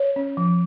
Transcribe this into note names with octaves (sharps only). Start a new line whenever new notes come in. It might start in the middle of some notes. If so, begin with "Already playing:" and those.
Already playing: C#5
C#4
F3